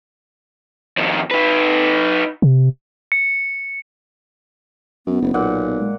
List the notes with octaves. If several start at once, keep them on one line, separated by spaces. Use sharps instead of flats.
F2 D#3
D#4 B4
C3
C#7
F#2 B3
F#1
B1 A#2 F#5
G#3